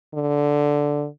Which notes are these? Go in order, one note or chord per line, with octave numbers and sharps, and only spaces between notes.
D3